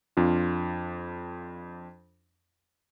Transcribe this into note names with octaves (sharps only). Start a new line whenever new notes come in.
F2 D4 F4